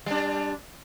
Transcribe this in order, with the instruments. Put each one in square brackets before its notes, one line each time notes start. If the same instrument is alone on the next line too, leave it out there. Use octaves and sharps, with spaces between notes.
[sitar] G3 D4